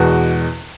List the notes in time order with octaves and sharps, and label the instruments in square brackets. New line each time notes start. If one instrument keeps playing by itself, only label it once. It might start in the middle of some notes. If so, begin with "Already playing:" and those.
Already playing: [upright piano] E2 B2 G#3 F#4